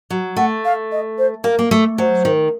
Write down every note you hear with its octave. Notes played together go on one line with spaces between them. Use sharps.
F#3
A3 F#5
F5
D#5
C5
A#3 A#4
A#3
A3
F#3 C5
D#3